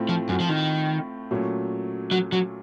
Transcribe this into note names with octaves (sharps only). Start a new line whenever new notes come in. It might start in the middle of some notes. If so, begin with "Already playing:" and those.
Already playing: A2 A3 C4 F4
F3
F#2
F3
D#3
A#2 F#3 A3 C#4
F#3
F#3